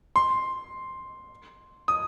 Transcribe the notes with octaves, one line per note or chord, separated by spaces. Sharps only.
C6
D#6